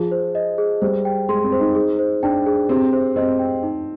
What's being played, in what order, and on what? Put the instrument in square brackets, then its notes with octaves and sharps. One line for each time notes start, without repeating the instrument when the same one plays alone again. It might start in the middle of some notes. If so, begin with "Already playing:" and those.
Already playing: [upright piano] F3 [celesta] G#4
[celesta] C5
D#5
G#4
[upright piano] G3 [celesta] C5
[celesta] G5
[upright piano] G#3 [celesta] C6
[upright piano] C4
[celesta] C5
[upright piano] D#4
[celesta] G#4
C5
[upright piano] D4 [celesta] G5
[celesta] G#4
[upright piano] C4 [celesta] G4
[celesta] C5
[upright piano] C4 [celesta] D#5
[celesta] G5
D#4